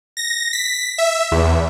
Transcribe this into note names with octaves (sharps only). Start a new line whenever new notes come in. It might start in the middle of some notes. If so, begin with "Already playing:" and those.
A#6
B6
E5
E2